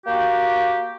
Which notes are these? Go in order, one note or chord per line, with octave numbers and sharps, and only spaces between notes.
A#3 F#4 G4